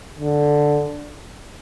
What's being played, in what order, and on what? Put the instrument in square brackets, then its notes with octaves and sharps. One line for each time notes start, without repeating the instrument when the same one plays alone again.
[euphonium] D3